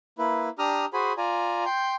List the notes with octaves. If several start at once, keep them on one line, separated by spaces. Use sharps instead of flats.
A#3 E4 B4
D4 G4 A#5 D#6 F6
F#4 G#4 C5 G#5 B5
F4 D5 G#5 A#5
G5 C6 G6